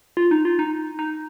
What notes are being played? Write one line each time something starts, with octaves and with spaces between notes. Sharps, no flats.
F4
D#4
F4
D#4
D#4